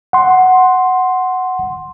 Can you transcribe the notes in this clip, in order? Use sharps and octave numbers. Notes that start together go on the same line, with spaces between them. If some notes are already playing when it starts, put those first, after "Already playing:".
F#5 C6